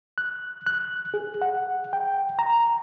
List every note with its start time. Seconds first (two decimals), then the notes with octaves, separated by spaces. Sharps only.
0.18 F#6
0.66 F#6
1.14 G#4
1.42 F#5
1.93 G5
2.39 A#5